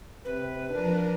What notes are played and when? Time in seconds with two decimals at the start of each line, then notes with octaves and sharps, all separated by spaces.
0.25 C3 B4
0.70 F3 D4 A#4